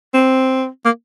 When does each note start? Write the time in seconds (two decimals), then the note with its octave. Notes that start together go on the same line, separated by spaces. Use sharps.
0.14 C4
0.85 A#3